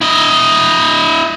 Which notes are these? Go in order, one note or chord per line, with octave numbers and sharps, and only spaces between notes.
E4 D#5